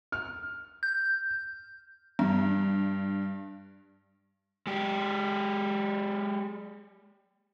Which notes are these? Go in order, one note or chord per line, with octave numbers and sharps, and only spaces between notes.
F6
G6
G2
G#3 G4